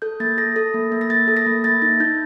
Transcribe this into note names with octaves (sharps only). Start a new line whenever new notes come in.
A4 G6
A#3 A6
A4 A#6
A4
A#3
A#3
A#6
A#3 A6
A4
A#6
A#3
A#3 A6
D#4 A6
D#4 G6